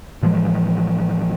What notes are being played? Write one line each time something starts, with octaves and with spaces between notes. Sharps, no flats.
A2 E3 F3 G#3